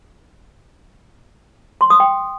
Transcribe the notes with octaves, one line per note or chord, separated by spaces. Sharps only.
C6
D#6
G5